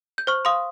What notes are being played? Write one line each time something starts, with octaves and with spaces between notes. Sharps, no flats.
G6
C5 C#6 F6
F5 C6 D#6